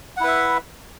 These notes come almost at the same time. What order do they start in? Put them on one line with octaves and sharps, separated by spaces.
F#5 E4 B4 E5